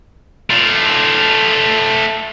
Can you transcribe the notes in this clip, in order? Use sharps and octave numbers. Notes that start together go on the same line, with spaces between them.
A3 F4